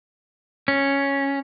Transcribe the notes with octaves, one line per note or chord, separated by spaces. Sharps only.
C#4